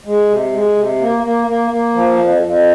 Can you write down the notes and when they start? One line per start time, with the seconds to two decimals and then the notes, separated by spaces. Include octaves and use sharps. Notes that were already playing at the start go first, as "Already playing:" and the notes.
0.05 G#3
0.29 C3
0.53 G#3
0.76 C3
1.00 A#3
1.23 A#3
1.47 A#3
1.71 A#3
1.95 F3
2.18 F2
2.42 F2